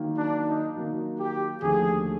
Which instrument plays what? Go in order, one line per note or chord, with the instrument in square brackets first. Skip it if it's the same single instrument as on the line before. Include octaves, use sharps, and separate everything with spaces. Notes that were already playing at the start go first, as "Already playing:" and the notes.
Already playing: [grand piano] D#3 F#3 A#3
[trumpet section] D4
D#4
[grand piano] D#3 F#3 A#3
[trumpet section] G4
[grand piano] D#2 D3 F3 A3 [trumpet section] G#4